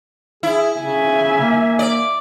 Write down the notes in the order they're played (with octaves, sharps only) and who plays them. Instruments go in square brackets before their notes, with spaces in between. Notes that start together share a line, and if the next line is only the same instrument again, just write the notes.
[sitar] E4 [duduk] G#4
[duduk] C#3 [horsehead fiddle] E5 G#5
[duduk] A#3
[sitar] D5